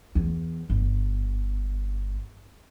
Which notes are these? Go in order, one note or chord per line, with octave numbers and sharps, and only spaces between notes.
E2
G1